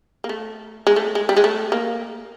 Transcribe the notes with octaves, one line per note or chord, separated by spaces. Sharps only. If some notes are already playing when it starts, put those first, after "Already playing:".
A#3
A3
G#3
A3
G#3
G3
G#3
A3
A#3